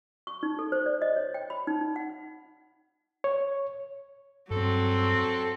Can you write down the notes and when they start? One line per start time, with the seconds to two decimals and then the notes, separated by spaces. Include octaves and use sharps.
0.27 C#6
0.43 D#4
0.59 A4
0.72 C5
0.86 D5
1.02 D#5
1.17 C#5
1.34 G5
1.50 B5
1.67 D#4
1.81 D#4
1.96 F#5
3.24 C#5
4.51 G2 F#3 C4 A4